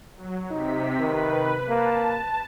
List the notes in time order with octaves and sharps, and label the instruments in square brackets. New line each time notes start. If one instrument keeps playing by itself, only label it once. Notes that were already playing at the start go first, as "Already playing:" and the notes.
[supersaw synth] F#3
[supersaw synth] C3 B6 [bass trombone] D#4
[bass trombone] D#3 [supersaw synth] B4
[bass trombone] A#3 [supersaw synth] A5